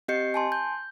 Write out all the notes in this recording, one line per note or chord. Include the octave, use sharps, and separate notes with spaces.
C4 G4 D#5 G6 C7 C#7
G#5 A5 C6
G6